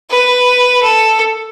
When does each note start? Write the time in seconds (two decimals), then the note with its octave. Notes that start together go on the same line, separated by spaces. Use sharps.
0.11 B4
0.82 A4